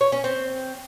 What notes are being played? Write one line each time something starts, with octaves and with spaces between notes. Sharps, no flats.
C#5
C#4
C4